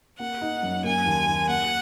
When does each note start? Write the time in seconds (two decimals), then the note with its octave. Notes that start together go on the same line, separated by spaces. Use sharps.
0.19 A#3 F#5
0.41 D#4
0.63 F#2
0.84 A#3 G#5
1.06 D#2
1.28 D#2
1.48 A#3 F#5